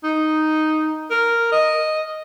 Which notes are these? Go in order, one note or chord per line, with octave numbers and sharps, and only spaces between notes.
D#4
A#4
D#5